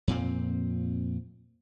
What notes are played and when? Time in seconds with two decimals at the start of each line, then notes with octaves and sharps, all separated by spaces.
0.08 F2 A#2 C4